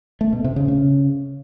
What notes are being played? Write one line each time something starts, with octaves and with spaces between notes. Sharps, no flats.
A3
B2
C3
C#3
C#3